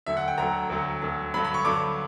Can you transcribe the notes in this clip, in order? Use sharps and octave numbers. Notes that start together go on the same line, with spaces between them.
D2 D3 F#3 E5
F#5
G5
D2 D3 F#3 A#5
D2 D3 F#3
D2 D3 F#3
G2 D3 F#3 B5
B5
C#6
G2 D3 F#3 D6